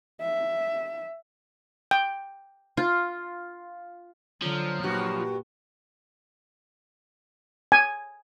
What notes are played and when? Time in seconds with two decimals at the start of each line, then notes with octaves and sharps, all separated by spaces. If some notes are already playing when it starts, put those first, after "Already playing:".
0.22 E5
1.91 G5
2.77 F4
4.42 D3 F3 F#3
4.83 G2 A#2 F#4
7.72 G#5